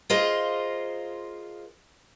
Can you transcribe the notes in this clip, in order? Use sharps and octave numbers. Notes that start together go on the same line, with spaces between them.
F4 G#4 A#4 C5 D#5 F5